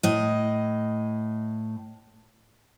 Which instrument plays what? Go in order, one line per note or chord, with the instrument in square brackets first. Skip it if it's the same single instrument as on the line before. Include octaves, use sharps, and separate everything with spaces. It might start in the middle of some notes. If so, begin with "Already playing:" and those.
[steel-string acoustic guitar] A2 D#5